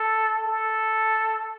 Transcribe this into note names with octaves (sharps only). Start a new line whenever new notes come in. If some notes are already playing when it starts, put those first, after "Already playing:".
Already playing: A4
A4